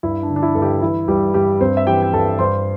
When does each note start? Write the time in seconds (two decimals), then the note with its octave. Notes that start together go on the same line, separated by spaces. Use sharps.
0.03 G2 E4
0.23 D4
0.29 D3
0.36 D4
0.42 E4
0.55 G2 A4
0.62 G3 G4
0.82 E3 E4
1.08 G2 G3 G4
1.34 G2 G3 G4
1.60 G2 C4 C5
1.77 E5
1.87 E3 G4 G5
2.02 G5
2.13 G2 A4 A5
2.39 G2 C5 C6